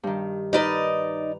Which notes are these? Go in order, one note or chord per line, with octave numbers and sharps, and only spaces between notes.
G2 D#3
D#4 A#4 B4 D5 D#5 A#5